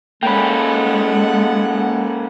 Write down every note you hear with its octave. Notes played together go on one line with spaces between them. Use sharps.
G#3 A#3 C#4 A4 F#5 G5 B5